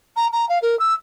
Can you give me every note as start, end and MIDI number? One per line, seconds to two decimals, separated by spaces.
0.16 0.27 82
0.32 0.48 82
0.49 0.58 77
0.62 0.78 70
0.79 0.94 88